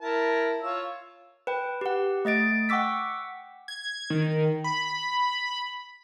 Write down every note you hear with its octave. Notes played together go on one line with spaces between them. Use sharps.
E4 A#4 A5
F4 C#5 E6
B4 G5
G4 F#5
A3 D#5 A6 D7
F#5 G5 C#6 D6 E6 B6
G#6
D#3
B5